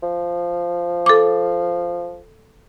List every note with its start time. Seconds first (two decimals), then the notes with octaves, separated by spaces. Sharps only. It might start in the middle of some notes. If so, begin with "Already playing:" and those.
0.03 F3
1.06 A4 D6